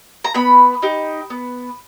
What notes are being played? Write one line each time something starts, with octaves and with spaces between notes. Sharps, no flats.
A#5
B3 B5
D#4 G4
B3